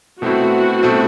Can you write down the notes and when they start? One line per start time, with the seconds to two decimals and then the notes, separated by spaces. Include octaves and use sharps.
0.22 B2 A3 C4 E4 F#4
0.82 B2 A3 C4 E4